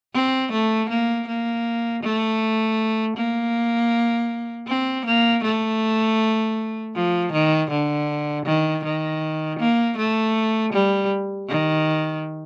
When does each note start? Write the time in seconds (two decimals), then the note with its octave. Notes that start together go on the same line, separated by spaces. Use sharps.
0.14 C4
0.52 A3
0.89 A#3
1.28 A#3
2.03 A3
3.17 A#3
4.68 C4
5.06 A#3
5.44 A3
6.95 F3
7.33 D#3
7.71 D3
8.46 D#3
8.84 D#3
9.59 A#3
9.98 A3
10.73 G3
11.49 D#3